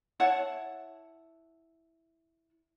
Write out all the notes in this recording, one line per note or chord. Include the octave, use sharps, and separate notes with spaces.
E4 C#5 F#5 A5